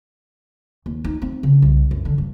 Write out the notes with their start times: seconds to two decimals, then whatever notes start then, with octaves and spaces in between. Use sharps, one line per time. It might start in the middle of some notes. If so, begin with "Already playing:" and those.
0.86 D#2
1.05 D#4
1.22 C4
1.43 C#3
1.62 C2
1.91 F#2
2.05 D3
2.18 G2